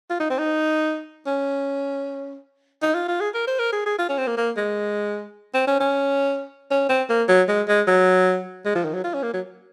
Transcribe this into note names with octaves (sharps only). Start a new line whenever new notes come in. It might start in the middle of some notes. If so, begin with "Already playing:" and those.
F4
D#4
C4
D#4
C#4
D#4
F4
F4
G#4
A#4
C5
A#4
G#4
G#4
F4
C#4
C4
A#3
A#3
G#3
C4
C#4
C#4
C#4
C4
A#3
F#3
G#3
G#3
F#3
G#3
F3
D#3
F#3
F4
C#4
A#3
F#3